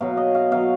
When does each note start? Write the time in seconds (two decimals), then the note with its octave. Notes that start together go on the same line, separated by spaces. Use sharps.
0.01 B2 F#3 F5
0.17 D#5
0.35 F5
0.51 B2 F#3 F5